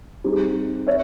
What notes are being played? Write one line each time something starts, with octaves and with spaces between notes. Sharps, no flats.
G3 C4 D#4 G#4
C#5 E5